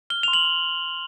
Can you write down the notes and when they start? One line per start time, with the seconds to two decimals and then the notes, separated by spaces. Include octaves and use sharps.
0.10 F6 G7
0.23 C6 F7
0.33 F#7
0.45 C6